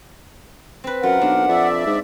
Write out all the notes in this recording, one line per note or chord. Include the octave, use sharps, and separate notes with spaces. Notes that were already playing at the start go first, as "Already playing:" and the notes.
C4 B4
F#2 F4 A#4 F#5
B1 D4
F2 D5 E5
G#2